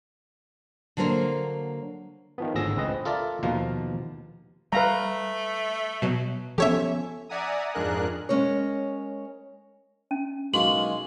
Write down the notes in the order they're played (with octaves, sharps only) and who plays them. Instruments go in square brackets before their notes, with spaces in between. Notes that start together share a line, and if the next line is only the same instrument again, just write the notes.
[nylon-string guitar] D3 F#3 A#3 A#4 C5
[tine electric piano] D#3 F3 B3
G#1 A2 D3 G#4 E6 A#6
C#2 C4 B4 D#5
[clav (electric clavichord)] F4 A4 A#4 D5 E5
D#2 B2 F3 F5 A#5
[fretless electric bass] G3 [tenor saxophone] A3 [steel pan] B4 F5 A#5
[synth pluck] B2 F#3
[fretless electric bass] F3 B3 [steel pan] C#4 A4 [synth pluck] G4 C#5 E5
[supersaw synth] D5 E5 F#5 G#5 A#5 D#6
F2 G#2 D4 G#4 A#4 F#6
[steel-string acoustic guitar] G#3 C#4 A#4 C#5
[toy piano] C#4
[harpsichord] B1 A#3 C#4 [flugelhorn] G#3 [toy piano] F#4 [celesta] F#7